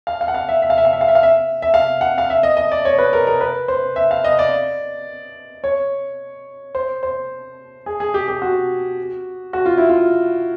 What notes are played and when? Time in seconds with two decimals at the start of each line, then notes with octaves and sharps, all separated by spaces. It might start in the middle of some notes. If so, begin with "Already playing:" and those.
0.07 F5
0.21 F5
0.28 F#5
0.35 F5
0.49 E5
0.62 E5
0.70 F5
0.78 E5
0.85 F5
0.93 E5
1.01 F5
1.08 E5
1.15 F5
1.23 E5
1.62 E5
1.74 F5
2.01 F#5
2.18 F5
2.30 E5
2.43 D#5
2.57 D#5
2.72 D5
2.85 C#5
2.98 B4
3.13 A#4
3.27 A#4
3.41 B4
3.68 C5
3.96 E5
4.11 F5
4.24 D#5
4.39 D5
5.64 C#5
6.75 C5
7.03 C5
7.86 G#4
8.00 G#4
8.14 G4
8.28 G4
8.42 F#4
9.53 F#4
9.66 F4
9.78 E4
9.89 F4